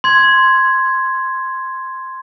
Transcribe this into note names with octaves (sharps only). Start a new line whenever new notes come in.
C6 G#6